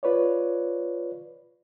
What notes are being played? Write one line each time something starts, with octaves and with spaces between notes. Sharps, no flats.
F4 B4 C#5 D5